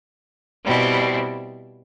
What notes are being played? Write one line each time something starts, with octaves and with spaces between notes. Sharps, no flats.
B2 G3 C4 E4